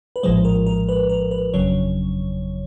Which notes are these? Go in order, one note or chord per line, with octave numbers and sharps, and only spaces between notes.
B4
A#1 A2 F3 G#3 C5
A#4
A#4
B4
A#4
B4
G1 F2 C#3 F#3 C#5